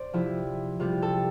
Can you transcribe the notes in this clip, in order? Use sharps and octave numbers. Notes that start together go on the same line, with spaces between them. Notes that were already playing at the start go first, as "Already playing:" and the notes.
Already playing: C5 D5
C3 F3 E4
C3 G3 F4
A4